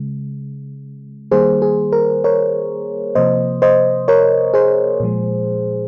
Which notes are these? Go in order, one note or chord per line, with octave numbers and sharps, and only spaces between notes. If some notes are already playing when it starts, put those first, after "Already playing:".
Already playing: C#3 G#3
D#3 G3 A#3 G#4 C5
G#4
A#4
A#4 C#5
C3 F3 A#3 C5 D#5
C5 D#5
A#4 C#5
G#4 C5
A#2 F3 G#3